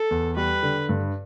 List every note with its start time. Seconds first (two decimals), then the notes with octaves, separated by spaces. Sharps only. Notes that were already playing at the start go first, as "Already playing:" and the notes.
Already playing: A4
0.11 E2
0.36 G3 B4
0.63 D3
0.89 G2